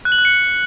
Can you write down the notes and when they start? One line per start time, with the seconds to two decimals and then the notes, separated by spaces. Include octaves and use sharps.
0.05 F#6
0.12 F#7
0.18 F#6
0.25 C#7